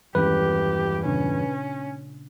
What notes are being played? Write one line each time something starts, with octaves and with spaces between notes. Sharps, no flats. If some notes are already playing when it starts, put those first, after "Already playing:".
E2 G2 D#3 E3 G#3 C#4 G4 B4
A#2 C#3 C#4 D4